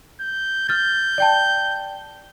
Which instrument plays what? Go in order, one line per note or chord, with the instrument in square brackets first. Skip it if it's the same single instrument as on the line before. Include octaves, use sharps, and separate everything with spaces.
[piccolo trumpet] G6
[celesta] F6 A6 [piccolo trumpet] G6
[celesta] D5 G5 A5